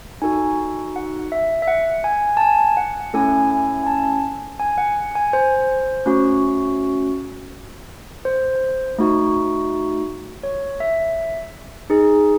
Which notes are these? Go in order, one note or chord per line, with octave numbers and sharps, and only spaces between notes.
D#4 F#4 A4 G#5
F#5
E5
E5
F#5
G#5
A5
G#5
F#5
A3 C#4 E4 A4 G#5
G#5
G#5
A5
G#5
F#5
G#5
C5
A3 C#4 F#4
C5
A3 D#4 F#4
C#5
E5
D#4 G#4